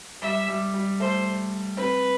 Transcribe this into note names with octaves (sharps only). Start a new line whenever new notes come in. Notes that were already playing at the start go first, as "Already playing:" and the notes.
G3 E5
G3
G3
A3 C5
C4 B4